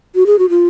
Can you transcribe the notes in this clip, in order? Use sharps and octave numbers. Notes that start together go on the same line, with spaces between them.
F#4
G#4
F#4
F4